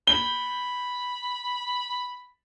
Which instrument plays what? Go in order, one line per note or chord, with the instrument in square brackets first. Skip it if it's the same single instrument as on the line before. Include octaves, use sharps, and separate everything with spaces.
[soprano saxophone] B5 [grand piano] G7